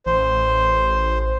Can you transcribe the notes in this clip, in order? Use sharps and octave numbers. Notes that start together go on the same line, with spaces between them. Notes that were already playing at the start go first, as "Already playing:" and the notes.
A1 C5